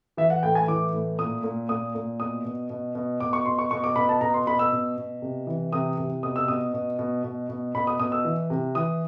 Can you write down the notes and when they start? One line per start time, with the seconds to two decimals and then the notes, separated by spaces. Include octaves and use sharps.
0.17 E3 E5
0.30 F#5
0.43 A2 G5
0.55 G#5
0.68 E3 D6
0.93 A2
1.19 A#2 D#6
1.44 A#2
1.69 A#2 D#6
1.95 A#2
2.20 B2 D#6
2.45 B2
2.70 B2
2.95 B2
3.20 B2 D6
3.33 C#6
3.46 B2 C6
3.59 C#6
3.71 B2 C#6
3.84 D6
3.96 B2 B5
4.09 A5
4.21 B2 A#5
4.34 C6
4.47 B2 B5
4.59 E6
4.72 B2
4.97 B2
5.22 C3
5.47 E3
5.73 C3 D#6
5.98 C3
6.23 B2 D#6
6.36 E6
6.48 B2 D#6
6.74 B2
6.99 B2
7.24 B2
7.49 B2
7.75 B2 B5
7.87 D#6
8.00 B2 D#6
8.12 E6
8.25 E3
8.50 C3
8.75 E3 D#6